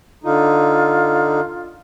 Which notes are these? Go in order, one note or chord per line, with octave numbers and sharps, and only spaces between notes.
D3 D#4 F4